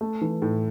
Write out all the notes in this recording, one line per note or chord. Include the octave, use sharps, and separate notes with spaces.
A3
E3
A2